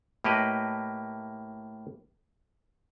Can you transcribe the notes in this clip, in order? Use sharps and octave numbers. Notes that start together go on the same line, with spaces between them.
A2 A#3 G4 B4 D#5